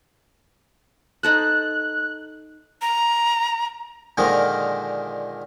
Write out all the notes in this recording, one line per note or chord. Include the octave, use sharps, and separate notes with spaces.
D#4 A4 C5 F#6
A#5
A#2 D3 D#3 F3 G#3 A#4